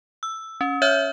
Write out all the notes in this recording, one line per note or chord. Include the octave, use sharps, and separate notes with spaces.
E6
C#4
C#5 E5 F6 G6